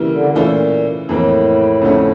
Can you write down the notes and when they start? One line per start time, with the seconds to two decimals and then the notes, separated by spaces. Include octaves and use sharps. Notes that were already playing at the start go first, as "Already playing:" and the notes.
Already playing: C#3 E3 G3 A#3 E4
0.11 D3
0.35 A#2 E3 A3 C#4 F4
1.08 F2 A2 E3 A#3
1.81 F2 D3 F3 A3 C#4